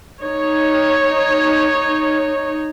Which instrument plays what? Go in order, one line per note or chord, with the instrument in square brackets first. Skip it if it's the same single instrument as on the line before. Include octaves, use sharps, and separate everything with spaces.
[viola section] D#4 C#5